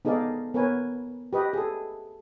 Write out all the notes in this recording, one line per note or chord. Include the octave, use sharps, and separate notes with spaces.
B3 D#4 G#4 A4 D5 F5
B3 A#4 B4 C#5 G#5
G4 B4 D#5
G#4 A4